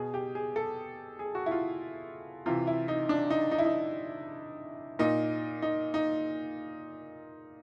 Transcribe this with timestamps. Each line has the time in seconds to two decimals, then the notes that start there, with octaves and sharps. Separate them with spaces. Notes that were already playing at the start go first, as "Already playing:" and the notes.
Already playing: B2 G#4
0.14 G4
0.35 G#4
0.56 A4
1.19 G#4
1.35 F#4
1.46 E4
1.51 F4
2.46 C3 E3 F4
2.67 E4
2.88 D#4
3.09 D4
3.30 D#4
3.51 D#4
3.58 E4
3.65 D#4
4.99 A#2 D#4
5.62 D#4
5.94 D#4